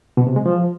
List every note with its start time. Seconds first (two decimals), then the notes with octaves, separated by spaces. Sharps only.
0.17 B2
0.27 C3
0.36 G#3
0.46 F3